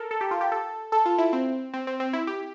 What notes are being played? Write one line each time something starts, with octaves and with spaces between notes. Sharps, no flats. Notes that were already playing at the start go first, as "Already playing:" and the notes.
Already playing: A4 A#4
A4
G4
F4
G4
A4
A4
F4
E4
C4
C4
C4
C4
E4
G4